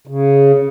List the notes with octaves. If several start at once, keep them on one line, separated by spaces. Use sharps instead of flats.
C#3